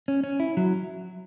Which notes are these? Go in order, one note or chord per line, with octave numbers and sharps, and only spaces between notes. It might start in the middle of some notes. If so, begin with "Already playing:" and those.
C#4
C#4
E4
F#3